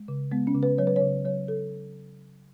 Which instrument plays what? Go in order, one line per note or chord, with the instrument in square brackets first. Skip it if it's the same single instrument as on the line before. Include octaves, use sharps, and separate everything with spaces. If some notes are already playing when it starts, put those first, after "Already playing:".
Already playing: [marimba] G#3
C#3
G#3 B3
C#4
C#3
B4
F#3 C#5
B4
C#5
C#3
F#3 C#5
A4